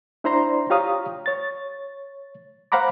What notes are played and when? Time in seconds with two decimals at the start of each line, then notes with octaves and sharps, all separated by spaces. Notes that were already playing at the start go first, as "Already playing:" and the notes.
0.24 D4 E4 C5 D5 A#5 C6
0.70 F4 G4 C#5 F5 A#5 D#6
1.26 C#5 A6
2.72 C5 F5 F#5 A#5 B5 D6